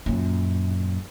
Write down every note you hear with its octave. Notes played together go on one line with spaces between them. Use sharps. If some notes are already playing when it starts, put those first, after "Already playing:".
F#2 A#2